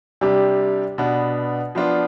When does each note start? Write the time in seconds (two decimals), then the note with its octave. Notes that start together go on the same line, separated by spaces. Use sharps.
0.21 C3 G3 D4 G4
0.98 B2 B3 D4
1.75 F3 B3 D4 F4